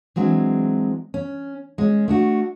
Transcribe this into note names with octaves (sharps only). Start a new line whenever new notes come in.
E3 F#3 G#3 C4 D4
C#4
G#3 C#4
A3 D4 F#4